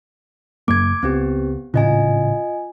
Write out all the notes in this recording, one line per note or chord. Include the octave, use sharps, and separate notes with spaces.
F#1 F#2 A#3 D6 G#6
C#2 B3 C4 G4
G#1 A2 C#3 F4 D#5 G#5